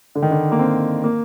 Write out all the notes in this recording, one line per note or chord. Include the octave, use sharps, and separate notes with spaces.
D3
D#3
D3
A#3
C4
A#3